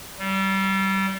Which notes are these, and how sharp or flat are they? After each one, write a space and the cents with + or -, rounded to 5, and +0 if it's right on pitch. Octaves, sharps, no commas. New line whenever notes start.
G3 -25